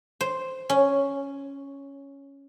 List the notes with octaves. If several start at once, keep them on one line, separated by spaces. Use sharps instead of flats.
C5
C#4